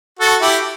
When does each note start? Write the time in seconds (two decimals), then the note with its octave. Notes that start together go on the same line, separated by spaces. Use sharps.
0.19 F#4 A4
0.41 E4 G4